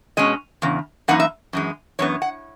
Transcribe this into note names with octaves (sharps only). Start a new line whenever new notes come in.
B2 G#3 C#4 D#5
E2 C#3
F#2 E3 A#3 D#4 F#5
E5
F#2 E3 G#3
F#2 E3 B3 C#5
F#5